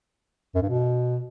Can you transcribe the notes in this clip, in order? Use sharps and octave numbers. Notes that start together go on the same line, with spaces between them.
F#2
G2
B2